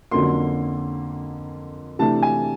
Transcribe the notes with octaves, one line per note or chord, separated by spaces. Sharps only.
F2 D3 F#3 A#3 C#4 C6
C3 E3 A3 D4 A5
G#5